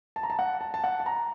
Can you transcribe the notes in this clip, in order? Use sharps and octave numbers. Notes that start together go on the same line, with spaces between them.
A5
A#5
A5
F#5
A5
A5
F#5
A5
A#5